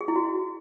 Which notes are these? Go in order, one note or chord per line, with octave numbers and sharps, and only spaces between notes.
G#4
E4
F#4